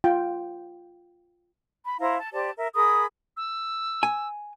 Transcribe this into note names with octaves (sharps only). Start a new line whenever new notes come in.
F4 G5
B5
E4 C5 F5 A#5
A5
G4 C5 D5 A5
A#4 E5
G#4 A#4 B5 D#6
E6
G#5